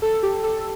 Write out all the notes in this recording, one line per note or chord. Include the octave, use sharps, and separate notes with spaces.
A4
G4
A4